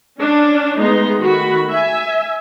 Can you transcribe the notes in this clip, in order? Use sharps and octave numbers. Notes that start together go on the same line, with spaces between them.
C#4 D4
G#3 A3 B3 D#4 A#5 C6
D#3 A3 F#4 B5
E5 G#5